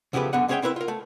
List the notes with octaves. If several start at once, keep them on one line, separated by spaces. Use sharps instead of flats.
E2 C#3 F3 A3 G4 B4
F#2 D3 B3 F#5
G#3 C#4 G#4 C#5 E5 G5
C4 E4 A#4 B4 E5
F4 A#4
A3